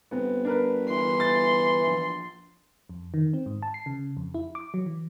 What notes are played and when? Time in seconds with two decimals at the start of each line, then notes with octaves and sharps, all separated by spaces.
0.11 G1 B3 C4
0.45 D4 A#4 B4
0.90 E3 C6
1.20 A6
1.87 A#1
2.89 F2
3.14 D#3
3.33 C4
3.46 G#2
3.62 A5
3.74 C7
3.86 C#3
4.17 F2
4.34 E4
4.55 D6
4.74 F#3
4.86 E3